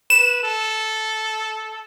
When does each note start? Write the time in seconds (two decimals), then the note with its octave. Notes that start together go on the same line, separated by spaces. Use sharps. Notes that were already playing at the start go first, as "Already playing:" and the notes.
0.10 B4 E7
0.43 A4